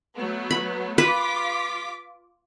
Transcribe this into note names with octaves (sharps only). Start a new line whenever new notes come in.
F#3 A3 B3
B5
F4 B4 D6 B6